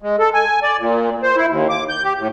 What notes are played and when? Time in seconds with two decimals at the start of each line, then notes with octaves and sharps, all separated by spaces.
0.02 G#3
0.19 A4
0.34 G#5
0.63 D5
0.79 A#2
1.23 C5
1.36 E4
1.48 D#2
1.69 D6
1.89 G6
2.05 G4
2.18 A2